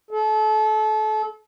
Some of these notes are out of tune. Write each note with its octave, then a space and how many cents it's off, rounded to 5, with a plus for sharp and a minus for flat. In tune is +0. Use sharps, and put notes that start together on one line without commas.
A4 -30